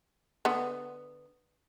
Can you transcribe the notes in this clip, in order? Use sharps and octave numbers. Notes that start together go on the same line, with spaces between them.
D3 B3